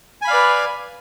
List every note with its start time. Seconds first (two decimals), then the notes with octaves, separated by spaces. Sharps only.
0.22 G#5
0.25 B5
0.28 F5
0.31 D5
0.34 B4